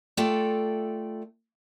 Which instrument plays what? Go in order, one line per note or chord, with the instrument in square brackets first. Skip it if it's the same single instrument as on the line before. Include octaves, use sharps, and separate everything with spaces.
[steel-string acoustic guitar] A3 F4 A4 D5 G5